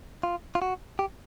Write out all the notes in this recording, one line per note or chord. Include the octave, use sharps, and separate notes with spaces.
F4
F4
F#4
G4